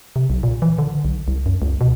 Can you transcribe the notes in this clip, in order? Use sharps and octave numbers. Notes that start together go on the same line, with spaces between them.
C3
B1
A#2
E3
D3
B1
C2
F#2
C#2
B2